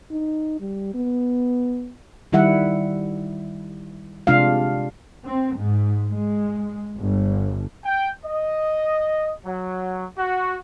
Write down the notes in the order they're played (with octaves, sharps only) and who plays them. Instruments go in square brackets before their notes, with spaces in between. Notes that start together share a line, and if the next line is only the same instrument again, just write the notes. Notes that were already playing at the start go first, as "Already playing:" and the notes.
[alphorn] D#4
G3
B3
[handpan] D#3 G3 E4 E5 F#5
C3 G#3 D4 F4 F5
[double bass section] C4
G#2
G#3
G1
[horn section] G5
D#5
F#3
F#4